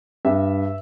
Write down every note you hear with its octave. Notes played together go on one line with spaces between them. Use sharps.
G2 E5